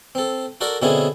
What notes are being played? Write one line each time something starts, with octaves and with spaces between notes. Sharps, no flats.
C4 A4
F#4 A4 A#4 D5
B2 D3 C4 C#4 E4 G#4